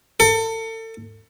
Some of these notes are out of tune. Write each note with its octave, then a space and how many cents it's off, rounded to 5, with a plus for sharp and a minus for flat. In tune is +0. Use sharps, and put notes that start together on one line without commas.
A4 +35